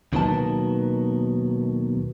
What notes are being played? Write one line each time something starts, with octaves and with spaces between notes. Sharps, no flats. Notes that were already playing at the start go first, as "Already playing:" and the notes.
D#2 B2 D#3 F#3 B3 A5